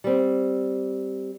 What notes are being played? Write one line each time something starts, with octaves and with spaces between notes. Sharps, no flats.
G3 C4